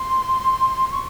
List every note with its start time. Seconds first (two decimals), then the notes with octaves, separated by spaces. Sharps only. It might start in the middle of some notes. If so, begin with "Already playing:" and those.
Already playing: C6
0.91 C#6